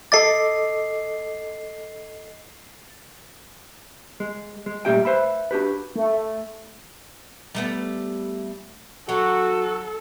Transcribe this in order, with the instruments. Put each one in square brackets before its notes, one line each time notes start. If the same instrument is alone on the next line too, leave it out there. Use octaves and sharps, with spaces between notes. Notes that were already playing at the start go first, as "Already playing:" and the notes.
[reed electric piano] A4 D#5 D6 [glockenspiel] A6 C7
[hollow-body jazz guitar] G#3
G#3
A#2 G3 A3 G4 E5 G5
B4 C5 E5 B5
D4 F#4 G4 B4
[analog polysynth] A3
[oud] G3 A3 B3
[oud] F#3 [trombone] F#4 [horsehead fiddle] A4